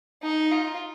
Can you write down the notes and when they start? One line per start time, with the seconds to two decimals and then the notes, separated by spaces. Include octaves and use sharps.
0.23 D#4
0.52 F4